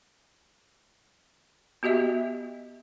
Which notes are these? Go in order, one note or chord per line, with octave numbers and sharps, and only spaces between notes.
B3 F#4 G4 D#5 E5